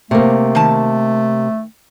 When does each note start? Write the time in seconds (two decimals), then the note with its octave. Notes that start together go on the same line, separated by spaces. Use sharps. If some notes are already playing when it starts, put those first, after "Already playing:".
0.11 C3 A3 A#3
0.55 D#3 A5